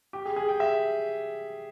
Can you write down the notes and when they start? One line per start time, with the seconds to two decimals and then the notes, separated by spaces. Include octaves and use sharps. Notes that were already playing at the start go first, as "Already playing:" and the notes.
0.13 G4
0.26 G#4
0.36 G#4
0.49 G5
0.60 E5